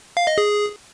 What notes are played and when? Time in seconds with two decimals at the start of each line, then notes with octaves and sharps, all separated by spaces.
0.17 F5
0.27 D#5
0.38 G#4